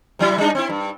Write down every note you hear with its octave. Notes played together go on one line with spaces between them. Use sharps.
C3 F#3 E4
G3 D4 D#4
C4 E4
G2